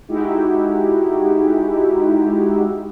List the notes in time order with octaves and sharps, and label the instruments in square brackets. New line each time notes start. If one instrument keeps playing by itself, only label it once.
[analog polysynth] G#3 D#4 E4 F#4 G4